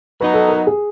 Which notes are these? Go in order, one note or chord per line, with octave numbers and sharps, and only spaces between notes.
F#3 B3 D#4 B4
A4
A#4
G#4